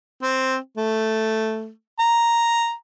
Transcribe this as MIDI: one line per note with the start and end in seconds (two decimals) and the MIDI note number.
0.23 0.56 60
0.77 1.70 57
1.99 2.72 82